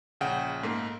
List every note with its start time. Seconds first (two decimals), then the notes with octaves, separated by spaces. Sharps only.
0.21 A#1 C#3 F#5 G5
0.63 G#2 A3 A#3